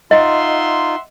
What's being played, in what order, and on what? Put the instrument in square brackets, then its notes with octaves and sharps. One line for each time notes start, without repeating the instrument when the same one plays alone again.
[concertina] D#4 F4 [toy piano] D#5 [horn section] E5 F#5 C6